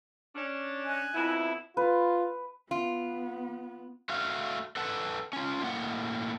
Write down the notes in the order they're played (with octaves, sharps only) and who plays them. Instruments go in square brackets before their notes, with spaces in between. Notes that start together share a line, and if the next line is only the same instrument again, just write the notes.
[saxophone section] C#4 D4
[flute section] D#5 G#5 F#6
[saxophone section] F2 B3 E4
[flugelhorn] F4 [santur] B4
[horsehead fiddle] B3 [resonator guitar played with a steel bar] F4
[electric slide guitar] A3 F#4 F5
A4 B4 F#5 A5
C#4 F4
A2 A#3 F#5